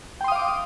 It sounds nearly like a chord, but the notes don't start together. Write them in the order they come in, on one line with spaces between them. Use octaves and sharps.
G5 C6 D#6 F5 D6